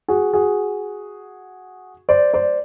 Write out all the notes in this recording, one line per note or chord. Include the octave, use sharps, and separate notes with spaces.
F#4 G#4
F#4 G#4
C5 D5
C5 D5